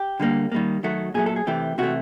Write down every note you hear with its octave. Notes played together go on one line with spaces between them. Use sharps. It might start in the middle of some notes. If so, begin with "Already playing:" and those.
Already playing: G4
D3 G3 A#3
D#3 G3 A#3
D#3 F#3 A3 F#4
A#2 F#3 A3 G#4
A4
G#4
C3 E3 A3 G4
C3 E3 A3 F#4